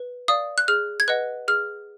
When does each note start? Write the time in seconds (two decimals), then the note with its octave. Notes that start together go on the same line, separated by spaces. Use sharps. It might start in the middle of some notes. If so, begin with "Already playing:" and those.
Already playing: B4
0.28 D5 F5 D#6
0.58 F#6
0.68 G#4 F6
1.00 G#6
1.08 B4 D#5 F#5 F#6
1.48 G#4 F6